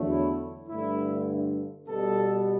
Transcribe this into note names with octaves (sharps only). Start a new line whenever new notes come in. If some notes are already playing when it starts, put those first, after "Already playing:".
Already playing: E2 D3 F#3 A3
E4
G2 D3 A3 E4
B2 G3 B3 A4